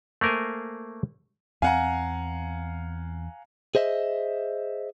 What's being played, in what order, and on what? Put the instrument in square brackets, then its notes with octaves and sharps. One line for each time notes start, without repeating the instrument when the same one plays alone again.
[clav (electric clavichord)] A3 A#3 A#4 C5 G#5
[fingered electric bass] E2 C4 [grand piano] F5 F#5 A#5 [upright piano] G#5
[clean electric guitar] G#4 C5 D#5 E5